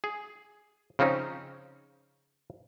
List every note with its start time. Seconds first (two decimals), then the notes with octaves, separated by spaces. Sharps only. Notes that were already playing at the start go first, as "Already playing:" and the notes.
0.04 G#4
0.99 C#3 F3 C4 C#4 D#4